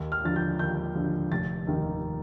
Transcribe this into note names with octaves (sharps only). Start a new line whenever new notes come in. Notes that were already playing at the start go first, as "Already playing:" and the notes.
Already playing: D#2
F6
D3 F3 A6
G6
D#2 G6
D3 F3
F1 A6
D#2 D#3